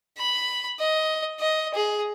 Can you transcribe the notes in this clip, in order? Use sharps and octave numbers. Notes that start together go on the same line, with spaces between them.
B5
D#5
D#5
G#4